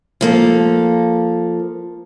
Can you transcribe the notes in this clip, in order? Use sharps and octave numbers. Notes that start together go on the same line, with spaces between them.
F3 A#3 A4